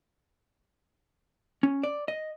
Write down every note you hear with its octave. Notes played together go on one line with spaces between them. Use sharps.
C#4
D5
D#5